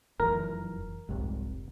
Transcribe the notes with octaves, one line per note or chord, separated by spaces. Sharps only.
F1 F#2 E3 A#4
F1 C2 G#2